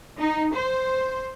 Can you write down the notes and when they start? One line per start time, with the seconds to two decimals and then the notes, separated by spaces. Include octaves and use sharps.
0.18 D#4
0.53 C5